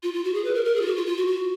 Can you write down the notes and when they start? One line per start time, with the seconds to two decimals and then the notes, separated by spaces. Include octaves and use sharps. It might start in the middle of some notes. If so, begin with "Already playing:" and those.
0.03 F4
0.14 F4
0.24 F#4
0.34 G#4
0.45 B4
0.55 A#4
0.65 A#4
0.76 G#4
0.82 F4
0.86 F#4
0.96 F4
1.06 F4
1.17 F#4
1.28 F#4